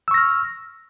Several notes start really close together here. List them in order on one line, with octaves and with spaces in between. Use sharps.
E6 C#6 A#6 F6